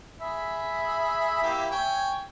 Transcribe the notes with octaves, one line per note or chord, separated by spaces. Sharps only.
G#4 E5 B5
A#3 E4 G4
C#5 G5 G#5